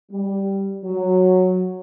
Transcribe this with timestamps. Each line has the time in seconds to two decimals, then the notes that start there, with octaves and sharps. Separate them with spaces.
0.11 G3
0.84 F#3